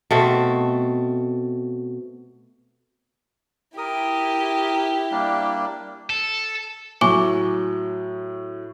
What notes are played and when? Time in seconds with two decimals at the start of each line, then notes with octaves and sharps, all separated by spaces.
0.11 B2 A3 C4
3.78 E4 G4 A#4 D#6
5.11 G3 A#3 D4
6.10 A4
7.01 A2 F#3 G#5 C#6 D6